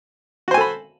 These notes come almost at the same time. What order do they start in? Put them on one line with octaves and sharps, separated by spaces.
F#4 C5 G#5 A4 B5